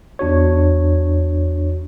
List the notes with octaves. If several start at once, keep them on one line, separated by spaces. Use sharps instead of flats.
E2 D4 F#4 C#5